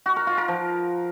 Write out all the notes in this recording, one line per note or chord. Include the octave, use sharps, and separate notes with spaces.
F#4
A#4
F4
A#4
F3